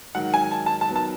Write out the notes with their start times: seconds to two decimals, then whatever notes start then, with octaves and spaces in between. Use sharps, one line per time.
0.15 G#2 D#3 F#3 F#5
0.34 G#5
0.51 A5
0.66 A5
0.81 A5
0.88 D#3 F#3 B3
0.96 A5